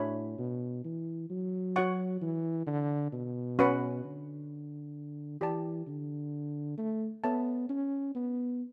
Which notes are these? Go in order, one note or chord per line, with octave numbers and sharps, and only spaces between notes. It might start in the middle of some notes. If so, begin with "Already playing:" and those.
Already playing: A2 D4 F#4 C#5 E5 B5
B2
E3
F#3
F#4 C#5 F#5 C#6
E3
D3
B2
C#4 F#4 B4 F#5
D3
E3 G4 D5 A5
D3
A3
B3 A4 C#5 E5 A5
C#4
B3